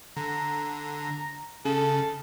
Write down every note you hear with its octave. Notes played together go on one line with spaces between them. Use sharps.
D3 A#5
C#3 A4